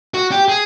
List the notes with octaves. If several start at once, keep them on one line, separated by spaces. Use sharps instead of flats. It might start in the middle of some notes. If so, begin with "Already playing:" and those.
F#4
G4
G#4